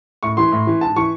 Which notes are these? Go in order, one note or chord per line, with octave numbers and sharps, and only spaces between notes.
A2 C#6
E3 C6
A2
E3
G#2 A5
E3 C#6